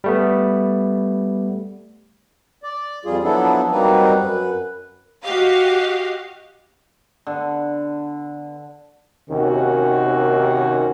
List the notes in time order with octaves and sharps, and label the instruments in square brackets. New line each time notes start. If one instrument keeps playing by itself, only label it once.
[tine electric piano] G3 A3 B3
[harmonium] D5
F2 G3 F4 G#4
F3 F#3 B3 D4 E4 A4
F#3 G3 A#3 C4 D#4 B4
F#2 B4
[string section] F#4 G4 D#5 F5
[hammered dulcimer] D3 B3
[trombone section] D#2 C3 D#3 C#4 F#4